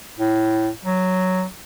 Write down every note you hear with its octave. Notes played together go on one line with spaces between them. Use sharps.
A2
F#3